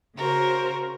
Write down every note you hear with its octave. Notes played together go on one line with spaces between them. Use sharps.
C#3 F#4 A#4 C5